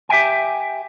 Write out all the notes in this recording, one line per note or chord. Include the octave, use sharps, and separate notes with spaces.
G4 E5 F5 G5 G#5